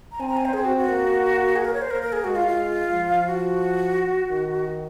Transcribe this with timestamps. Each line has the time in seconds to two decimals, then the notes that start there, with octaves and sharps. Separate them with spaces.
0.12 A#5
0.20 C4 G#5
0.28 A#5
0.37 G#5
0.45 C5
0.54 C4 G#4
0.65 F#4
0.77 F#4
0.88 A#3
1.56 G#4
1.65 A#4
1.73 C#5
1.82 C5
1.90 A#3 A#4
2.02 A#4
2.13 G#4
2.24 G#3 F#4
2.36 F4
2.48 F4
2.92 F3
3.27 F#4
4.30 D#3